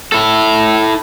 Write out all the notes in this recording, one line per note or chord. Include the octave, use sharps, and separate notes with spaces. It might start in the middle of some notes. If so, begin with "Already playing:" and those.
E4 A4